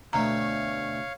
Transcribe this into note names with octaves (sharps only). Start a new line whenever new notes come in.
D2 B2 A3 C#5 F5 A#5